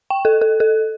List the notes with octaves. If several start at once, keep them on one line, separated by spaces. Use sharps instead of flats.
G5
A4
A4
A4